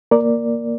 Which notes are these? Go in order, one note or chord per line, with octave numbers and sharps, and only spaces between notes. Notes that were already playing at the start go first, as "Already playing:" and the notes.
A#3 A#4 D5